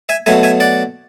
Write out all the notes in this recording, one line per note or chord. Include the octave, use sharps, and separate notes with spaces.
E5 G#5
B2 F#3 A3 E5 G#5
E5 G#5
D5 F#5